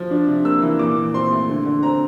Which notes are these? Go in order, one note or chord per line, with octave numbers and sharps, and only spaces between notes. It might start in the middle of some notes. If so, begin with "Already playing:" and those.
Already playing: F3
D4
C3
A#3 E6
E3
A#2 D6
A#2
C4 C6
A3
D3
D3
C4 A#5